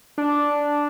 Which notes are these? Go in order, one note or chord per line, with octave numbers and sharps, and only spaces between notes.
D4